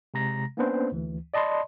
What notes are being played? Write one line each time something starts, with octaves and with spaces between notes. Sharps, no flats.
C3 G#3 A#5 A#6
A#3 B3 C#4 D4 B4 C5
D2 E3
D5 D#5 A5 B5 C6